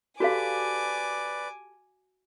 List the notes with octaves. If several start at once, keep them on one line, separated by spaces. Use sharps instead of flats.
F#4 G4 A4 B4 D5 F5 G#5 D6